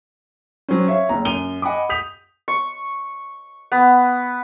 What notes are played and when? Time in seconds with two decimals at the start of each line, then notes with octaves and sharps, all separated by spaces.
0.69 F#3 C4 C#4
0.88 C#5 E5 F5
1.09 F#1 A#5
1.25 F#2 D#7 F7 G7
1.62 D#5 F#5 G#5 B5 D6
1.89 D#6 G6 B6 F7
2.48 C#6
3.72 B3